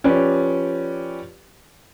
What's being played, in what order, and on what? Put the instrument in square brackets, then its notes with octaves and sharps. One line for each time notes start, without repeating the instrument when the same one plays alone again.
[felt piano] F3 C#4 G4 B4 D5